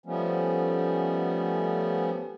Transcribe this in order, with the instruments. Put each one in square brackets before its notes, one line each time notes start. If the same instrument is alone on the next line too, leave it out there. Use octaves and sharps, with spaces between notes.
[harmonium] F3 G3 A3 B3 C#4